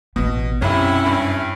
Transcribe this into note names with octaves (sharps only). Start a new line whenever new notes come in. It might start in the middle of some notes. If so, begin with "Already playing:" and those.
A1 B2 B3
B1 F#2 C3 C#4 E4
G2